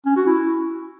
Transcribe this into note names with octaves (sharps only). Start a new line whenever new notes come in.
C#4
F#4
E4